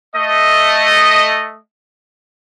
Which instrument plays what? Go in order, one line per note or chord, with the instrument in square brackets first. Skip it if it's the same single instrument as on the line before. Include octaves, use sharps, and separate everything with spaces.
[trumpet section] A3 D#5